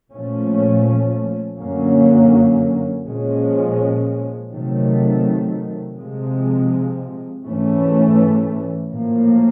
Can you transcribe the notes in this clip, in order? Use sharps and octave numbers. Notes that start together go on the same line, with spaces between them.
A#2 F3 A3 C#4
F#2 D3 F#3 A#3 C#4
A#2 F3 G#3 C#4
C3 D#3 F#3 A3
C3 F3 G#3
G#2 E3 A3 C#4
A2 F3 A#3